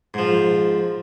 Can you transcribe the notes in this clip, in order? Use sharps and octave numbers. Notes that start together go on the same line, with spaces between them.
G#2 F3